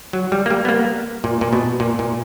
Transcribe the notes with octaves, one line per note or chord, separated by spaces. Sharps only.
F#3
G3
A#3
G3
B3
A#3
A#2
A#2
B2
A#2
A#2